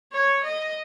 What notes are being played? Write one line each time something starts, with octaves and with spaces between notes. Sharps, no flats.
C#5
D#5